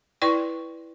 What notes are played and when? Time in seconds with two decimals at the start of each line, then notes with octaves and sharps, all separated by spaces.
0.22 E4 B4 D5 G5 C#6